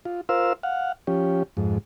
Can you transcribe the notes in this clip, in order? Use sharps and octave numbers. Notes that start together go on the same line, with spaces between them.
F4
F4 A#4 C5 F5 E6
F5 F#5
F3 C#4 G4
F2 G#2